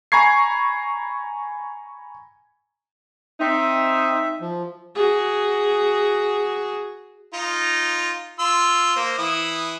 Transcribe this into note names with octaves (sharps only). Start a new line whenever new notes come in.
G#5 A#5 B5 C#6 G#6 C7
C4 D#4 E5
F3
F#4 G#4
D#4 F4
F4 C6 E6
A#3 C5
E3 E4 D#6